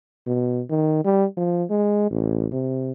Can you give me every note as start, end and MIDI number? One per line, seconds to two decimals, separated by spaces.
0.27 0.62 47
0.70 1.04 51
1.05 1.25 55
1.37 1.64 53
1.70 2.07 56
2.11 2.47 33
2.52 2.92 48